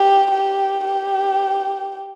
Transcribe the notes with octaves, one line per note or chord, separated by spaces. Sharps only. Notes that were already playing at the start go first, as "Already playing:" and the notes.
Already playing: G4
G4
G4